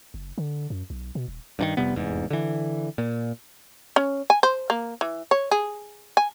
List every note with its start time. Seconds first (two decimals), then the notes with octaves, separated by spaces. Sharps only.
0.14 F#1
0.38 D3
0.70 F#2
0.90 B1
1.15 B2
1.28 D#1
1.59 G2 D3 D#3
1.77 F1 C3 G3 B3
1.95 F1 E2 G#2
2.30 D3 E3
2.98 A#2
3.96 C#4
4.30 G#5
4.43 C5
4.70 A#3
5.01 E3
5.31 C#5
5.51 G#4
6.17 G#5